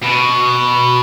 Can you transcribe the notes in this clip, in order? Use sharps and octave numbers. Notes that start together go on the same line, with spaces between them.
B2